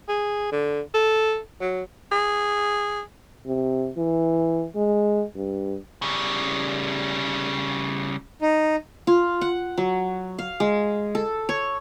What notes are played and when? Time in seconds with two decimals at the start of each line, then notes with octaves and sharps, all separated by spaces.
0.08 G#4
0.52 D3
0.94 A4
1.61 F#3
2.11 G#4
3.46 C3
3.97 E3
4.76 G#3
5.36 G2
6.02 C#3 G3
8.42 D#4
9.07 F4
9.41 F#5
9.78 F#3
10.39 F5
10.60 G#3
11.15 A4
11.49 C#5